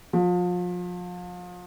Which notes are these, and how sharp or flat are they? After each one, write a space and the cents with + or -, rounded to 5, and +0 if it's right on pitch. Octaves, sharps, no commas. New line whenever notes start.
F3 +35